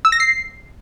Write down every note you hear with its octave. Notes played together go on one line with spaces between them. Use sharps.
E6
A#6
C7